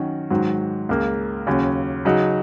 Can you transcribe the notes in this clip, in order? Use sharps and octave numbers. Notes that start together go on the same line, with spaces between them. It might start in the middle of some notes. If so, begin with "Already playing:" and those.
Already playing: D#3 F#3 C#4 F#4
G#2 D#3 F#3
C#2 C#3 A#3
D#2 C#3 F#3 C#4
C#3 F#3 D#4